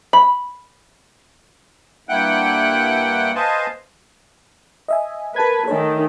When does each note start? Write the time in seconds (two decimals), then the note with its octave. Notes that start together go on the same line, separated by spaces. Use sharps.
0.13 B5
2.09 G2 A#3 E4 F#5 G5 F#6
3.35 B4 C5 D#5 F5 G#5 A5
4.88 D#5 E5 G#5
5.36 A#4 B4 A5 G#6
5.68 D#3 A3 C#5 G#5